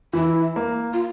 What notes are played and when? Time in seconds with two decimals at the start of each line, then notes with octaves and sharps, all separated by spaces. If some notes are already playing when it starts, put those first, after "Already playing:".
0.13 E3 E4
0.56 A#3
0.93 F4